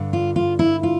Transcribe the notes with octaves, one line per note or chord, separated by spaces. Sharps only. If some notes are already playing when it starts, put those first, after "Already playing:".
Already playing: G2 D3
F4
F4
E4
F4